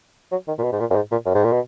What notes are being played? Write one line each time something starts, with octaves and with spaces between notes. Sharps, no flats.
F#3
D#3
A#2
B2
G#2
A#2
F#2
G#2
A#2
F#2
G#2
A#2
B2